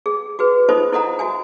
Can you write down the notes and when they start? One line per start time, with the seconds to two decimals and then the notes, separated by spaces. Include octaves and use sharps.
0.06 G#4
0.39 F#4 G#4 B4
0.69 D#4 F4 A4 C5 D#5
0.92 E4 A4 D#5 F#5 A#5
1.19 F#4 E5 G#5